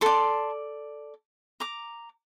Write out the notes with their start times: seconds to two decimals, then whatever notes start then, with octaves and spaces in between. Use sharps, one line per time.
0.01 A4 D5 A5 C6
1.60 A#5 D6